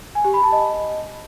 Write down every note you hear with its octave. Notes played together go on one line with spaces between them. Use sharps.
G#5
G4
B5
A5
D#5